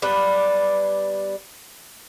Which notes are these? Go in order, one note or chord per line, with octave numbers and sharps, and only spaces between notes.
G3 B3 D4 B4